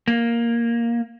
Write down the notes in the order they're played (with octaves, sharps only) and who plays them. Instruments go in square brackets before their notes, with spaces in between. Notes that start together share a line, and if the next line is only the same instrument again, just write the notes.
[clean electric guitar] A#3